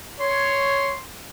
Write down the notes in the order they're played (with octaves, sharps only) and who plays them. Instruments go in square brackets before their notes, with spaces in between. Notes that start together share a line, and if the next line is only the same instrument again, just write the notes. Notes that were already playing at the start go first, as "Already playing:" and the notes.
[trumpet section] C#5 [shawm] C6